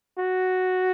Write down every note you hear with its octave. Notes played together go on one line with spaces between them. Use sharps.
F#4